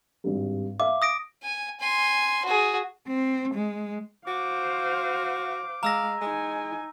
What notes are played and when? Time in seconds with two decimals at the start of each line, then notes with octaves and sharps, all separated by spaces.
0.24 G#1 G2
0.80 E5 F5 D6
1.02 D#6 A#6 D7
1.43 G#5
1.80 G#5 C6
2.45 F#4 G#4
3.08 C4
3.55 G#3
4.27 F#4 C5 F5 D6
5.83 G#3 F5 A#5 E6 A#6
6.21 G#3 D#4 G#5